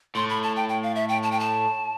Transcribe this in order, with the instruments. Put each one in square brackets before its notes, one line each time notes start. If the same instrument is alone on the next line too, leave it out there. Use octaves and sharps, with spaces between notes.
[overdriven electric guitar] A2 [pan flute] C6
[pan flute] B5
A5
G5
G5
F5
E5
G5
A5
G5
A5